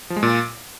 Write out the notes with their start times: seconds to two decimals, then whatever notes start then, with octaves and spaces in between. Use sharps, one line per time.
0.10 F3
0.16 G#3
0.23 A#2